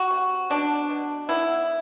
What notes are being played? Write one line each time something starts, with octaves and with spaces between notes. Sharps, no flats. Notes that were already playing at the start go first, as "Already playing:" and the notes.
Already playing: F#4
C3
B2 D4
B2
B3 E4